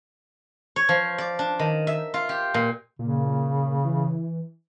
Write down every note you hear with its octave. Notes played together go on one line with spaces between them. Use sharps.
C#5
F3
D5
D4
D#3
E5
F4
G4
A#2
A#2 C#3
E3